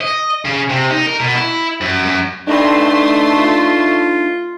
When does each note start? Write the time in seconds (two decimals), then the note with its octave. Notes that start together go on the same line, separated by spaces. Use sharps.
0.01 D#5
0.45 C#3
0.70 C3
0.91 D#4
1.06 A#4
1.20 B2
1.35 E4
1.81 F#2
2.05 F#2
2.47 A3 D4 D#4 B4 C6
3.33 F4